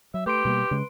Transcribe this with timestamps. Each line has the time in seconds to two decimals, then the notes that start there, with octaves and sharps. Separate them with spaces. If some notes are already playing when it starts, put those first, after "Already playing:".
0.14 F#3 E5
0.26 A3 G4 B4 C6 D7
0.45 B2 G3 A#3
0.71 C#3 G#3